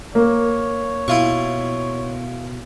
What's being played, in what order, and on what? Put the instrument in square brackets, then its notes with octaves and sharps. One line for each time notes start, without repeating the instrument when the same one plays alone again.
[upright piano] A#3 [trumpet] C#5
[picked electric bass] B2 [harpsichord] E4 F4 C#6